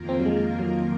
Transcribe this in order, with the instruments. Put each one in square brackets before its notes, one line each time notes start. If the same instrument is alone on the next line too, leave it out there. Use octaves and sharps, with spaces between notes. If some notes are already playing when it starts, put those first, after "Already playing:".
Already playing: [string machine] F2 D#3 A#3 F4 A#4
[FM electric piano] C4
F#3
G#3
F#3